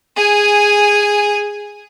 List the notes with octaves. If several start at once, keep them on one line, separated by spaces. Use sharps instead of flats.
G#4 G#5